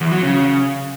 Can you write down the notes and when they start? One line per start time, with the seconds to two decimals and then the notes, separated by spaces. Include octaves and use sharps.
0.01 E2
0.12 F#3
0.23 C#3